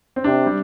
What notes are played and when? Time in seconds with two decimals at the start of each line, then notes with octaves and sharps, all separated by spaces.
0.16 C4
0.24 C3 D4
0.46 G3